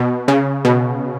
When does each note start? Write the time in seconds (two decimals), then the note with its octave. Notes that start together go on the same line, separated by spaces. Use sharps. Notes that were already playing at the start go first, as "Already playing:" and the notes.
Already playing: B2
0.28 C#3
0.65 B2